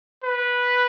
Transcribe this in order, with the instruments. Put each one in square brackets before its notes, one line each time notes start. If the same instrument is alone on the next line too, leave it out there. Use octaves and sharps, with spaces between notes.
[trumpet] B4